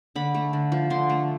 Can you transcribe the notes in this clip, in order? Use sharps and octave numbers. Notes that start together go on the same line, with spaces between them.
D3 B5
A3
D3
F3
D3 C6
A3